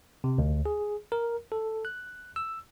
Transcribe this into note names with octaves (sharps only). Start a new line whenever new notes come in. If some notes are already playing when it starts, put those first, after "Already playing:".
C3
D2
G#4
A#4
A4
F#6
E6